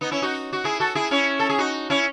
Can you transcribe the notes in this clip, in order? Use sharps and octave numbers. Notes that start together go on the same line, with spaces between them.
B3 D#4
C#4 E4
D#4 F#4
F#4
E4 G#4
F#4 A4
E4 G#4
C#4 E4
A4
G#4
D#4 F#4
C#4 E4